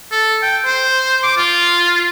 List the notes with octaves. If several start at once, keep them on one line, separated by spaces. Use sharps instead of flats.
A4
G5
C5
D6
F4